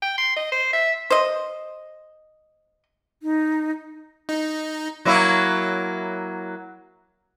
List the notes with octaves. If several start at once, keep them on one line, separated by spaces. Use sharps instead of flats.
G5
C6
D#5
C5
E5
C5 D#5
D#4
D#4
F#3 A#3 E4